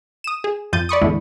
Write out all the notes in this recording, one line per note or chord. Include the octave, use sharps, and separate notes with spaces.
D#6 E7
G#4
F2 F3 G6 A6 D#7
D5 B5 C#6 D#6
E2 A2 D3 G#3 E4